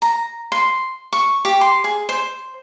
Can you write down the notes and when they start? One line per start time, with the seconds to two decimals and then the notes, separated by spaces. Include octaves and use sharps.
0.02 A#5
0.52 C6
1.13 C#6
1.45 G4
1.61 C6
1.84 G#4
2.09 C5